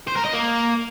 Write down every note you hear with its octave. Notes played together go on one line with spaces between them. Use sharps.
C5
A#4
D#5
A#3